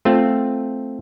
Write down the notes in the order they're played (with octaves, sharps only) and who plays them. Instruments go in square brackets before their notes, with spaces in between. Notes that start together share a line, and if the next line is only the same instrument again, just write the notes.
[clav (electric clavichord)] A3 C4 F4